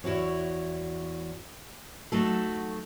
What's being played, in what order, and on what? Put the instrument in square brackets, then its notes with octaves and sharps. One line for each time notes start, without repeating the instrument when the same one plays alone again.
[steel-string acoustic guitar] E2 E4 F#4 C#5
F#3 A3 D#4 F#4 A4